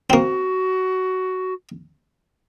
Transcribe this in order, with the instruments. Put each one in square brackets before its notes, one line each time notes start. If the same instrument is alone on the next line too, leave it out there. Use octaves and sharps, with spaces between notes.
[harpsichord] A#3 C4 [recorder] F#4